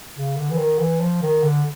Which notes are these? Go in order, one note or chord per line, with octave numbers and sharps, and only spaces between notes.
C#3
D3
E3
D#3
E3
F3
D#3
D3